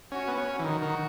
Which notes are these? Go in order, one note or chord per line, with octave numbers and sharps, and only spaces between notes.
C#4 F#4
B3
C#4
E3
D#3 F#4
D#3